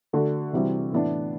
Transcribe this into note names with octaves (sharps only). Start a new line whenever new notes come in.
D3 A3 D4 F#4
C3 E3 G3 C4 F#4
A2 E3 B3 D4